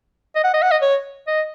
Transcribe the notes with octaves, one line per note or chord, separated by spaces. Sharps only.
D#5
F#5
D#5
F#5
D#5
C#5
D#5